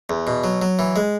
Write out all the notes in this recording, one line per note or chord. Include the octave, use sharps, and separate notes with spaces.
E2
B2
F#3
F#3
E3
G#3